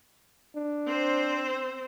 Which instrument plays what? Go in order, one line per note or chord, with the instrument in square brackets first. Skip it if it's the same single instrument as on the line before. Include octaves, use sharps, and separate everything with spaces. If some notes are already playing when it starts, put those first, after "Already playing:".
[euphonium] D4
[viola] C4 C5